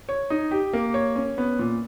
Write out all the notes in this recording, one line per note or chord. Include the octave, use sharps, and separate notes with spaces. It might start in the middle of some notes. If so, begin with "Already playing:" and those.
C#5
D#4
G4
A#3
C#5
C#4
B3
A#2